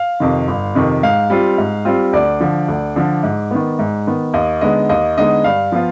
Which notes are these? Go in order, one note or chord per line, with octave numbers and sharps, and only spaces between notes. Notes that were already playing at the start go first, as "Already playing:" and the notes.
Already playing: F5
F2 C3 D#3
G1
F2 C3 D#3
G#2 F5
G3 C4 F4
G#2
G3 C4 F4
D2 D5
D3 F3
D2
D3 F3
G#2
D#3 B3
G#2
D#3 B3
D#2 D#5
D3 G#3 B3 D#4 D#5
D#2 D#5
D3 G#3 B3 D#4 D#5
G2 F5
F3 B3 F4